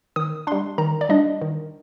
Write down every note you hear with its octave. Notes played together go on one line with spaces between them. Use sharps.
D#3 D#6
G3 D4 C6
D#3 A#5
D5
G3 D4 D#5
D#3